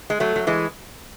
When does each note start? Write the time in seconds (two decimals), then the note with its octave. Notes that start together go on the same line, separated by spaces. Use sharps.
0.10 G#3
0.20 F#3 A3
0.36 F#3
0.47 E3 G#3